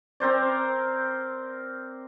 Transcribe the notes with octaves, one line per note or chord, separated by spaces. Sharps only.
C4 A#4 C5 D5